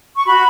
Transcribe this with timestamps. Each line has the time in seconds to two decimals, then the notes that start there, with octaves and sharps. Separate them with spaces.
0.16 C#6
0.25 F#4 B5